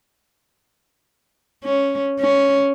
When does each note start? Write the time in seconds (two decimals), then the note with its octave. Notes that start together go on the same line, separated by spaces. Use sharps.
1.64 C#4
2.20 C#4